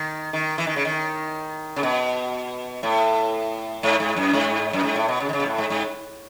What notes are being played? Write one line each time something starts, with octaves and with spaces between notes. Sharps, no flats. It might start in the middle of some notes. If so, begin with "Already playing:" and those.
Already playing: D#3
D#3
E3
D#3
C#3
D#3
C#3
B2
A2
G#2
G#2
F#2
G#2
F#2
G#2
A2
B2
C#3
D#3
C#3
B2
A2
G#2
G#2